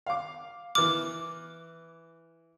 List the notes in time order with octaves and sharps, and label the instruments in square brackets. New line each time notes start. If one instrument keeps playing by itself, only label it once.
[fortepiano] F5 D6
[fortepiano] E3 F6 [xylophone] D6